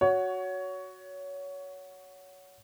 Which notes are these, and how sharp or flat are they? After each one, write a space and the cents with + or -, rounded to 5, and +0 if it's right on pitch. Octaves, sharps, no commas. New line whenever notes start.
F#4 +0 C#5 +20